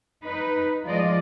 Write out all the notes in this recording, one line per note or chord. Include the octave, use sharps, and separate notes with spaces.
D#4 B4
F3 G#3 F4 D5 D#5